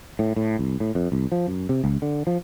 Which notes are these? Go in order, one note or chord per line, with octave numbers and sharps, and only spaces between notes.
A2
A2
C2
A2
F2
C2
F3
F#2
C3
C#2
D3
F3